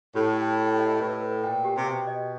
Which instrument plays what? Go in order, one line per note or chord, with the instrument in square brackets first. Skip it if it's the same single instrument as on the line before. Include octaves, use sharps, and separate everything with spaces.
[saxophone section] A2 [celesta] G4
[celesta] G5
G4
D#5
[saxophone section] A2 [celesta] B4
[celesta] B4
[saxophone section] A#2 [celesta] G5
[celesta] G4
[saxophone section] C3
[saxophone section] B2 [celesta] G5
[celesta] D#5